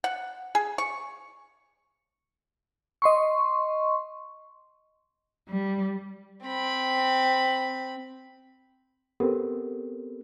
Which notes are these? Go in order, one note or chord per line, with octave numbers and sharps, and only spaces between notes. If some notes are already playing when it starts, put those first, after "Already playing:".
F#5
G#4
C#6
D#5 C6 C#6
G3
C4 B5
B3 C4 G4 A4 A#4